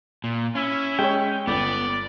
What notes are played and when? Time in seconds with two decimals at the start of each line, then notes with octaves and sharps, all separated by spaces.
0.24 A#2
0.55 C#4 E4
0.99 G#3 C#5 G5
1.47 G1 B3 D5